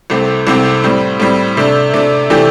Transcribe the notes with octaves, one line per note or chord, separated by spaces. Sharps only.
C2 C3 A3 C4
C2 C3 A3 C4
A2 G3 C4
A2 G3 C4
C3 A3 D4
C3 A3 D4
C3 E3 A3 D4 G4